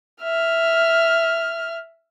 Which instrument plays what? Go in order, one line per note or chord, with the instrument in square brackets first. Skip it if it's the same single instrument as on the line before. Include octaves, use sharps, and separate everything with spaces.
[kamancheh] E5 F6